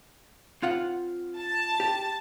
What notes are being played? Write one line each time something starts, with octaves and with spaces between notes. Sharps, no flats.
C4 F4 F#5
A5
G4